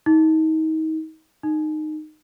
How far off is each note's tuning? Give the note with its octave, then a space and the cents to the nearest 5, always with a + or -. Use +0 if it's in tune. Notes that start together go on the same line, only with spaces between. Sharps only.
D#4 +30
D#4 -15